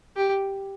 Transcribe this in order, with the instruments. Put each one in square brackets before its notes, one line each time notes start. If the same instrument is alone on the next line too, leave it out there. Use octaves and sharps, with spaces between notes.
[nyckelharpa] G4